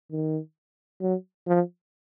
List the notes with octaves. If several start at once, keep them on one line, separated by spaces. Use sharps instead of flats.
D#3
F#3
F3